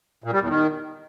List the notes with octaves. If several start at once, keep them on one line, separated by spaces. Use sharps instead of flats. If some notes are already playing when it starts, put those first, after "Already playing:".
A#2
G3
E2
D#3